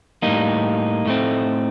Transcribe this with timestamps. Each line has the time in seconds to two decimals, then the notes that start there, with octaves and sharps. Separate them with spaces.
0.22 A2 G3 A#3 D#4
1.06 A2 A3 C4